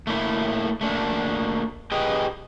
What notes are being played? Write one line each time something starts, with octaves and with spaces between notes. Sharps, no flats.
A3 A#3 E4
A3 A#3 D4
G4 G#4 B4 D#5 G5